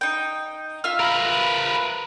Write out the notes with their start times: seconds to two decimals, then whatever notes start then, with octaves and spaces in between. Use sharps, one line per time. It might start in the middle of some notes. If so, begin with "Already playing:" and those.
0.01 D#4 G5
0.84 F4 E5 F6
1.00 A#4 B4